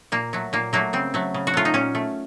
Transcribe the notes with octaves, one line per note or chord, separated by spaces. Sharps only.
A#2 A#3
F#3 A3
A#2 A#3
F#3 A3 A#3
C#3 C4
F#3 A3
C#3
F#4
F#3 A3 F4
D#4
A#2 C#4
A3